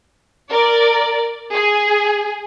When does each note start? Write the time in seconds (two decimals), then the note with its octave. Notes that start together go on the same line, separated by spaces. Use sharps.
0.50 A#4 D5
1.54 G#4